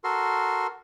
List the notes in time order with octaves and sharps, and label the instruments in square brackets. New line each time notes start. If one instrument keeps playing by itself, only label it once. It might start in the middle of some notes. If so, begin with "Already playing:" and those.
[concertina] F#4 A4 A#4 C6